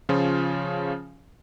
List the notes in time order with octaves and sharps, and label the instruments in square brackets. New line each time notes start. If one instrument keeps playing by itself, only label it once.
[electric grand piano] C#3 F3 C#4 F4